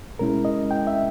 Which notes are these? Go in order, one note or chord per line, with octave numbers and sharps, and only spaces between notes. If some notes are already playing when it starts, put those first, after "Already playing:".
B2 G#3 C#4 E4 A#4
D#5
G5
E5